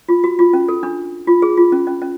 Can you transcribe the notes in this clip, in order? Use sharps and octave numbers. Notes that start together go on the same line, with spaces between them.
F4
F#4
F4
C#4
A4
D4
F4
G#4
F4
C#4
C#4
C#4